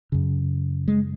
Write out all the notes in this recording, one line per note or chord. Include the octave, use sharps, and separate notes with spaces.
F#2 C#3
G#3